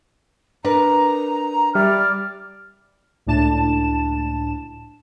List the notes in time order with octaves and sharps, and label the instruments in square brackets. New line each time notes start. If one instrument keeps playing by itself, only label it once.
[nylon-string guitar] D4 A#4 B4 [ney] A#5
[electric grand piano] G3 E5 [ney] D5 [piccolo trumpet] F6
[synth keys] C#2 A2 D4 A5 E7